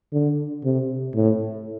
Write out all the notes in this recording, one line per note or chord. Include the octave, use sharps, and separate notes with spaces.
D3
C3
A2